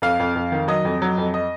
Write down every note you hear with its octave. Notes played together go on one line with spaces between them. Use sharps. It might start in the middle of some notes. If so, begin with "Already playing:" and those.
F2 F5
F2
F2
D#3
F#3 D#5
F2
F#3
F2
D#5